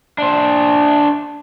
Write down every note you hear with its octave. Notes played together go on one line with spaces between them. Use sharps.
D4 C5